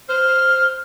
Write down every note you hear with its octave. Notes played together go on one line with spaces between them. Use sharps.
C5 F6